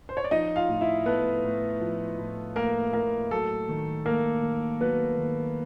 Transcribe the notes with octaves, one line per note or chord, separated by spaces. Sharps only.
C5
C#5
D5
F3 D#4 D#5
F4 F5
A2
E4 E5
A3 B3 B4
A2
F3
A2
A3 A#3 A#4
A2 A#3 A#4
F#3 A3 A4
D#3
A3 A#3 A#4
D#3
F#3 B3 B4
D#3